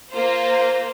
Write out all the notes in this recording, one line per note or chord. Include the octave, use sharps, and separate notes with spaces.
A#3 F4 C5